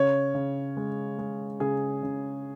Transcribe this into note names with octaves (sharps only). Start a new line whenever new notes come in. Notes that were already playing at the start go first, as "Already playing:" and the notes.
Already playing: C#3 C#5
C#3
G#3
G#3
C#3 G#4
C#3